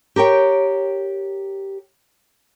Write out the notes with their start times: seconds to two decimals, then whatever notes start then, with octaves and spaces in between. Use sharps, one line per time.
0.16 G4 A#4 C#5 G5